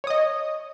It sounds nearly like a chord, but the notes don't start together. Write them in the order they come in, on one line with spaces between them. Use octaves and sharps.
C#5 D#6 D#5